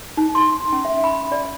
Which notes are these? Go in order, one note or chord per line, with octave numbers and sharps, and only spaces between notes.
D#4
C6
C#4
E5
B5
D5